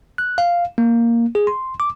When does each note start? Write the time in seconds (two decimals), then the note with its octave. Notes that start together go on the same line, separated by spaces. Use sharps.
0.18 F#6
0.38 F5
0.78 A#3
1.35 G#4
1.47 C6
1.80 D6